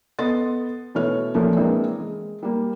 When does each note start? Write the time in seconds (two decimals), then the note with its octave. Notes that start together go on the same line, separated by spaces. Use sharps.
0.19 B3 A4 D#5 C6 A6
0.95 B2 E3 A3 C#5 F6
1.34 A#2 F3 A3 A#3 C#4
1.57 E3 G#3 A#3 C4 D4
2.00 G#3
2.43 G3 A#3